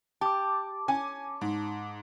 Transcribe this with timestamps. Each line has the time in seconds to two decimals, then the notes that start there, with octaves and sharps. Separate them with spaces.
0.21 G4 A5 D6
0.88 C#4 G#5
1.41 G#2